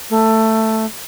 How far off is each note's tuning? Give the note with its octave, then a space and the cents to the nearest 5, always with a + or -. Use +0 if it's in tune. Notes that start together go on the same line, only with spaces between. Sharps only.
A3 +10